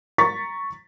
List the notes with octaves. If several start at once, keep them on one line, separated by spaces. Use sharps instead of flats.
A#5 C#6 A6 B6